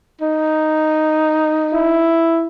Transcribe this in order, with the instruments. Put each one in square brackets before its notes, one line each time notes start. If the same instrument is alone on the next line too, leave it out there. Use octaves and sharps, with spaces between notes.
[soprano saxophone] D#4
[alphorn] E4